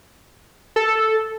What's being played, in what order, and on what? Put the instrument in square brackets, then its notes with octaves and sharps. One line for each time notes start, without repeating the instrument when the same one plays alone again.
[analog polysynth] A4